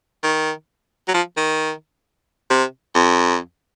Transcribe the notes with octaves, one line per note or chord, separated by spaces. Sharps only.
D#3
F#3
F3
D#3
C3
F2